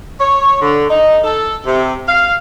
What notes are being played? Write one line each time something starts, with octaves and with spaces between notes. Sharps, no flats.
C#5
D3
D#4
A4
C3
F5